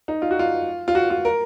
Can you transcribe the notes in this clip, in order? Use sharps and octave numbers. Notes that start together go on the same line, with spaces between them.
D#4
F4
F#4
F4
F4
F#4
F4
A#4